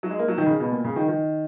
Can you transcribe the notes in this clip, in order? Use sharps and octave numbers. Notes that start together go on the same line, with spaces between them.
F#3
G#3
A#3
F#3
D#3
C#3
B2
A#2
C#3
D#3
D#3